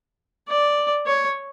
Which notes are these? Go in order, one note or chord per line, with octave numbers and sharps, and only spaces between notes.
D5
C#5